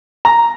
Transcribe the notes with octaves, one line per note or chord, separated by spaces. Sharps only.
A#5